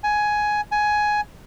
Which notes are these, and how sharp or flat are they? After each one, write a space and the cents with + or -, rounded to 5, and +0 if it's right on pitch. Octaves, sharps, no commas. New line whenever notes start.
G#5 +10
G#5 +10